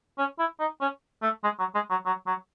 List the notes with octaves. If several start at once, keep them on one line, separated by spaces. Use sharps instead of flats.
C#4
E4
D#4
C#4
A3
G#3
F#3
G#3
F#3
F#3
F#3